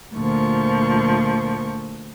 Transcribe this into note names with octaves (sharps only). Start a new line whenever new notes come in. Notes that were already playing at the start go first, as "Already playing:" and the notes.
D2 A#2 F3 C#6